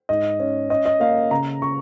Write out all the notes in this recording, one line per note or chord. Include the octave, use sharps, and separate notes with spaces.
G#2 D#5
C#4
C#4 D#5
D#5
A#3 F5
C#3 A#5
C#3 C#6